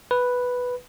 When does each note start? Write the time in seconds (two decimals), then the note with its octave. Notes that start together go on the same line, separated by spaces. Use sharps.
0.11 B4